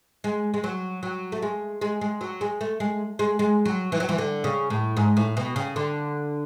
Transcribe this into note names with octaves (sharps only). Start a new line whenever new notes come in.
G#3
G#3
F#3
F#3
A3
G#3
G#3
G#3
F#3
G#3
A3
G#3
G#3
G#3
F#3
E3
F#3
E3
D3
C#3
A2
G#2
A2
B2
C#3
D3